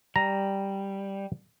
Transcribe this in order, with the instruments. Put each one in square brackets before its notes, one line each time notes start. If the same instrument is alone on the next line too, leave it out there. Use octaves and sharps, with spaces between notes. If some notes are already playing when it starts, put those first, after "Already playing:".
[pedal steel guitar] G3 [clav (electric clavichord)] A#5